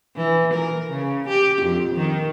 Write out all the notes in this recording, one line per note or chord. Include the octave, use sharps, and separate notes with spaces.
E3
A#4
C#3
G4
F2
D#3